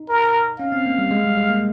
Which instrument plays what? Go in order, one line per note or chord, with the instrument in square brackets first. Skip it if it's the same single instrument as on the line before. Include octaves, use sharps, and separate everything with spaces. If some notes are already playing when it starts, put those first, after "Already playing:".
Already playing: [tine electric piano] D#4
[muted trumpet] A#4
[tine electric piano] C#4 [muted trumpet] F5
[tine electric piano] C4
A#3
G3
G#3
G3
G#3
A#3